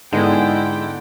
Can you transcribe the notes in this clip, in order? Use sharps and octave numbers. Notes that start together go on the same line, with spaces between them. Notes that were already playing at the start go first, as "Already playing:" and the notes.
G#2 D3 G#3 B3 E4 A4 G5